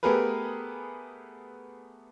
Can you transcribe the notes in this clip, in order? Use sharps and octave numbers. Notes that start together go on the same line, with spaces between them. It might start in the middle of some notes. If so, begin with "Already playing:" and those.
A3 B3 G4 G#4 A#4 B4